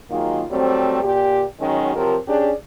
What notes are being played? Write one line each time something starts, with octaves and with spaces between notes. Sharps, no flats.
D#3 F#3 G#3 A#3 F4
F#3 G3 A3 C4
A#2 G4
D#3 F#3 G#3 C#4 F#4
C3 F3 F#3 A#4
C#4 D4 G4 G#4 D5